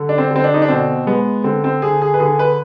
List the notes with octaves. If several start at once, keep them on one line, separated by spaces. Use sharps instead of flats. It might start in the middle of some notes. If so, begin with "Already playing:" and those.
Already playing: D3
D4
C4
D3 C4
D4
D#4
D4
B2 C4
G#3 B3
D3 C4
C4
D3 G#4
G#4
B4
D3 G#4
B4